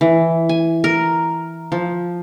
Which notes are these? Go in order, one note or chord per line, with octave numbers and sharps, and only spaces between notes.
E3
G#5
A#4
F3